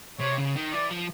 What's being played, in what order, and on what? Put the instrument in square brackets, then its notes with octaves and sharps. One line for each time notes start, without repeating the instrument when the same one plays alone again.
[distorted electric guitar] C3 [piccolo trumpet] C#5
[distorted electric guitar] C#3
D#3
[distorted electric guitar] E3 [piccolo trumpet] D5
[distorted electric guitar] F3